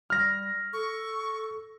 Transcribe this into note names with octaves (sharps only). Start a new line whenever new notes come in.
G3 F6 A#6
A4 C#6